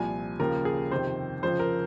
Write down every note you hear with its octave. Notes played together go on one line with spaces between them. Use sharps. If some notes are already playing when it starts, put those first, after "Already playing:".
Already playing: C2 A#2 F3 G#5
D#2 C#3 F3 A#4
G#4
F2 C3 D#3 C5
F2 C#3 F3 C5
A#4